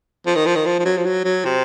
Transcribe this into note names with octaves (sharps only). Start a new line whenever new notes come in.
F3
D#3
F3
D#3
F3
F3
F#3
F3
F#3
F#3
C3